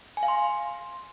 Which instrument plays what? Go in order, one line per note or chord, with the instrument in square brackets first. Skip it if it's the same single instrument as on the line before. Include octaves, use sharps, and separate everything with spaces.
[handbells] G#5
F5
C6